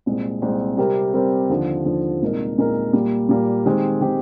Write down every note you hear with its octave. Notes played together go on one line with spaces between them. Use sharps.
C2 A#2 G#3 C4
C2 A#2 G#3 C4
C3 G3 C4 G4 A#4
C3 G3 C4 G4 A#4
D#2 D3 F3
D#2 D3 F3
C2 A#2 G#3 D#4 A#4
C2 A#2 G#3 D#4 A#4
A#2 G3 A#3
A#2 G3 A#3
D#3 G#3 C4 G4
D#3 G#3 C4 G4